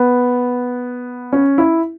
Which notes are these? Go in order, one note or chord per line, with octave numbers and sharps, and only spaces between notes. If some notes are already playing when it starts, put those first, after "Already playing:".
Already playing: B3
C#4
E4